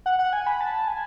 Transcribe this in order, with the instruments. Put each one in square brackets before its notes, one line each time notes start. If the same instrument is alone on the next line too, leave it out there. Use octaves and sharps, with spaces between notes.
[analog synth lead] F#5
F#5
G#5
B5
A5
G#5